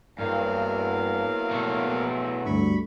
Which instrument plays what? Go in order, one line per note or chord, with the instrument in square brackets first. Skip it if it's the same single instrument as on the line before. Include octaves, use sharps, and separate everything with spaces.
[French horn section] E2 E3 F#3 [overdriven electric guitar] G2 [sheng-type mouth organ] A#3 F5
[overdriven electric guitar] B2 A3
[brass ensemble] D2 G2 [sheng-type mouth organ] B5 C#6